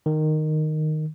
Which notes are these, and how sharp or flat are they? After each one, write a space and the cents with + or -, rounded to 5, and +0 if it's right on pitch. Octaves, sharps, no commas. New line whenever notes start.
D#3 -10